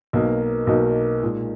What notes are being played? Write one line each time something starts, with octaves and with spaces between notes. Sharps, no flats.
B1 B2 A#3 D#4
B1 B2 A#3 D#4
A#2 G#3 D#4